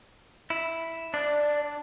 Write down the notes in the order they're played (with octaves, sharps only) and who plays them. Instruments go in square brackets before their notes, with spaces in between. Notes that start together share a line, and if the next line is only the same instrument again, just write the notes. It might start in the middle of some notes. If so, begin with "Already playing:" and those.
[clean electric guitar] E4
[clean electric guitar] D4 [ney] D5